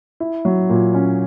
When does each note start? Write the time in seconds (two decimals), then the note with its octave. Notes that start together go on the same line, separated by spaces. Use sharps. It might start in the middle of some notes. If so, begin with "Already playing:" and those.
0.20 E4
0.45 F#3
0.69 A#2
0.94 C#4